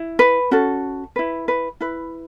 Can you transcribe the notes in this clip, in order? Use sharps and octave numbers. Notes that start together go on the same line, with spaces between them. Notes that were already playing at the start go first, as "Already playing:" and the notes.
Already playing: E4
B4
C#4 F#4 A4
E4 B4
B4
E4 B4